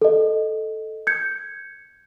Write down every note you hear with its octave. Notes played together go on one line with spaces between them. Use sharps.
A4 D#5
G6 G#6 C#7